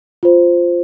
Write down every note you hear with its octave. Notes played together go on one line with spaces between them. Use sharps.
F4 C5